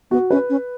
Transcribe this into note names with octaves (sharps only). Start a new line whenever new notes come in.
B3 F#4
C#4 B4
C#4